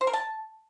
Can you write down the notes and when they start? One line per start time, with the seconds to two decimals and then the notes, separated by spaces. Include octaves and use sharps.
0.01 C5
0.07 A#4
0.13 A5